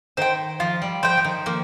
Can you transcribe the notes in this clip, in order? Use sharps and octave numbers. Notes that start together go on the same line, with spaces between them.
D#3 C5 G5
F3 F4
G3
F3 C5 G5
F3
D#3
F3 A#3